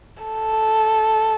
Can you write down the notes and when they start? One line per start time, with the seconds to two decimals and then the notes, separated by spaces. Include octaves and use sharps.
0.23 A4